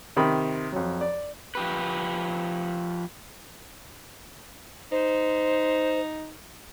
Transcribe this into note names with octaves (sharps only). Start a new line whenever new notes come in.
C3 D#3 B5
F2 F#3
D5
F3 G4 B4
D#4 C5